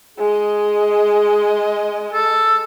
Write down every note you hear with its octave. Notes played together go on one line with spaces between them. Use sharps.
G#3 G#4 D#5
A4